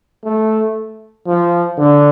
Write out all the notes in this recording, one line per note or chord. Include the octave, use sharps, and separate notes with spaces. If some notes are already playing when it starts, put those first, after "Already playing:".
A3
F3
D3